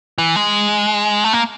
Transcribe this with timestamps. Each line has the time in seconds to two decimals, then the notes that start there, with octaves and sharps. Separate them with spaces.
0.18 E3
0.36 G#3
1.24 A3
1.33 A#3